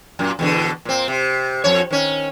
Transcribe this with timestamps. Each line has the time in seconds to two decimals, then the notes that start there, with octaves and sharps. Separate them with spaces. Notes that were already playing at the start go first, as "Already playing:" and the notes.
0.19 F#2 A#2
0.39 E2 B2 D3
0.85 A#2 C4
1.08 C3
1.64 F2 C#5
1.91 D#3 C#4